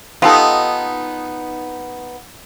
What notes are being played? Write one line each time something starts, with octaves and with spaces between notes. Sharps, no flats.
B3 D#4 F4 G4 A4